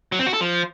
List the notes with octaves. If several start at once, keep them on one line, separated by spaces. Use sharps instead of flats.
F#3
C4
F#4
A4
F3